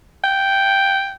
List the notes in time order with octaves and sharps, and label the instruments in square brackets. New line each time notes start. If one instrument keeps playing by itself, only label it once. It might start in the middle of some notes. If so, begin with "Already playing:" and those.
[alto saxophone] G5